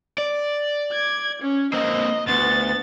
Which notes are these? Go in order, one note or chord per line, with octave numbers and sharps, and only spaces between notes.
D5
G#6
C#4
A#3 C4 D#5
D2 B3 A6